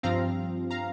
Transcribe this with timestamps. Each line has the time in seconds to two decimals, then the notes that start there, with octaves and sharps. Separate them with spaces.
0.03 G2 F3 C4 F5 A#5
0.71 F5 A#5